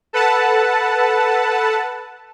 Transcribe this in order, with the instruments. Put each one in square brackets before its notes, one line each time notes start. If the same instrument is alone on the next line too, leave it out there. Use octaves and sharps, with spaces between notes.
[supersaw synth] A4 B4 F#5 A5